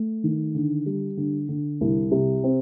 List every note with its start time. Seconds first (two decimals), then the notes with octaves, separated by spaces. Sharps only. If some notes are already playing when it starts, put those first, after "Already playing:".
Already playing: A3
0.24 D#3
0.55 D3
0.86 G3
1.17 D3
1.49 D3
1.81 C2
2.11 C3
2.44 C4